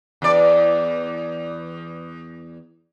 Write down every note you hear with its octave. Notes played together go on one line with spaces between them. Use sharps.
E2 D5